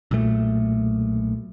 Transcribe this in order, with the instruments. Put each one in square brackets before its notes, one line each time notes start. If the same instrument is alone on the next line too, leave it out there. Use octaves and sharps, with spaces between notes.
[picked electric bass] B1 A#2 A3